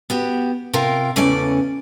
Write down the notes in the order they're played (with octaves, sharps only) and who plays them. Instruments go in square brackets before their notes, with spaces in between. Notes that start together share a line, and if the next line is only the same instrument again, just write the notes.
[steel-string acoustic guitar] B3 F#4 G4
C3 F4 A#4 F5 G5
E2 C#3 E3 A3 C#4 D5